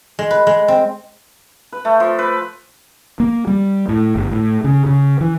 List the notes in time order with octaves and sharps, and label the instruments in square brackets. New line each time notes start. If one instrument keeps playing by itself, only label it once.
[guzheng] G#3
B4
G#3
C4
[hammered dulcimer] B4
A3
F3
B4
[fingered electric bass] A#3
G3
A2
G1
A2
C#3
C#3
E3